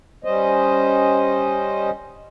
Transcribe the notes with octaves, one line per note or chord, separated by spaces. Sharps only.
G3 C#4 C5 D#5